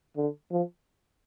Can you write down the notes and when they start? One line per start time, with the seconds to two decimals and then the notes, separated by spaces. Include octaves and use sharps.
0.17 D3
0.51 F3